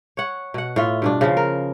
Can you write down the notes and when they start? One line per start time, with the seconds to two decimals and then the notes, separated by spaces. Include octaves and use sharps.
0.17 C#5 F#5
0.54 B2 F#5
0.76 A2 F4 E5
1.02 G2 B2 D4
1.21 C#3 F3
1.37 A#4